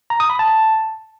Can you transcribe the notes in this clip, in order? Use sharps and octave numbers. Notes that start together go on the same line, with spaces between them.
A#5
D#6
B5
A5